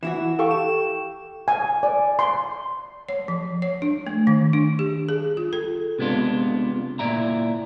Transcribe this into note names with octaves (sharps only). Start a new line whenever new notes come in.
E3 E4 F#4 E7
G4 A4 F5 C#6
E7
G#5
D5
C6
C#5
F3
C#5
D4
A3
D#3
D4
G4
G#4
F4
A4
C3 G#3 B3 D4 F4
A#2 E4 D5 E5 A#5